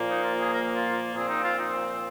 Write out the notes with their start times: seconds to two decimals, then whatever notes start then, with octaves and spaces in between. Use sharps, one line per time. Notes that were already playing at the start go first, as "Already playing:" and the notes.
Already playing: A#2 F3 A#3
0.09 D#4
0.23 F4
0.39 G#4
0.53 A#4
0.74 F4
1.13 A#2 F3 C4 G#4
1.29 D#4
1.44 F4
1.59 D#4